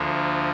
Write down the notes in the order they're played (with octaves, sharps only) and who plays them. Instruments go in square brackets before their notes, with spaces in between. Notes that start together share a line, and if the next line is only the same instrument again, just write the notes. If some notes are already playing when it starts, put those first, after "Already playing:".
Already playing: [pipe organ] D2 D3 F3 A#3